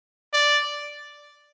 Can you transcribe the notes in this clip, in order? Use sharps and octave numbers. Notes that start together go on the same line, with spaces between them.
D5